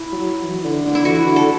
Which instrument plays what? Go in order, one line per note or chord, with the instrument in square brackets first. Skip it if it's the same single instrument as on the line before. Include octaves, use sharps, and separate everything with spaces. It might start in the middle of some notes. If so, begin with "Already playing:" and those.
Already playing: [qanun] E4
[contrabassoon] F#3
E3
D3
D3
[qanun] E4
[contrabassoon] E3 [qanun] F#4
[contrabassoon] D3
[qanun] A4